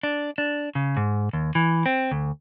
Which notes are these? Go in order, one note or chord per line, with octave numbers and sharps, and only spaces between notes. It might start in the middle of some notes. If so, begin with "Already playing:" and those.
D4
D4
C#3
G#2
D#2
E3
C4
D2